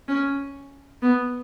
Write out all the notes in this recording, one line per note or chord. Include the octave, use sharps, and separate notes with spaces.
C#4
B3